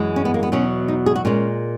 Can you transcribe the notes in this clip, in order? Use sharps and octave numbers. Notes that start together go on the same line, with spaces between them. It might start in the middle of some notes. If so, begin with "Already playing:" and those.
Already playing: F#2 E3 G#3
C#4
B3
A#3
B3
E2 B2 F#3 C#4
D#4
G#4
F#4
A#2 G#3 C#4